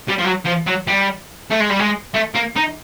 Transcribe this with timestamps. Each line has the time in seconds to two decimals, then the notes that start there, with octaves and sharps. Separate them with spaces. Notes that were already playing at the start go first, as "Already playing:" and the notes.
0.08 G3
0.18 F3
0.24 F#3
0.45 F3
0.67 F#3
0.87 G3
1.50 A3
1.60 G#3
1.70 G3
1.79 G#3
2.14 A3
2.35 A#3
2.56 D#4